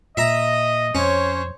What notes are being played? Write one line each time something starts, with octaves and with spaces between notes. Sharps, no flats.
A#2 D#5 E5 A#5
F2 C#4 C5 C#5